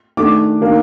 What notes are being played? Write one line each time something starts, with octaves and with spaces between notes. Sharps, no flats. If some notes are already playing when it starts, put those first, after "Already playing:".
D#3 A3 D4 D6
D#3 A#3 D4